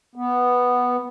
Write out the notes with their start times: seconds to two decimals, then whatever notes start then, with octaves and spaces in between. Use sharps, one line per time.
0.16 B3